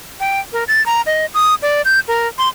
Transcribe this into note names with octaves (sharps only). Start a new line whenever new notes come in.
G5
A#4
A6
A#5
D#5
D#6
D5
G6
A#4
C6